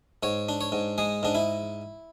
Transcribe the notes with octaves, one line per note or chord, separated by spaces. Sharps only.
G#2 C#5
D4
C#5
G#2
G#3 G#4
G#2 D4
E4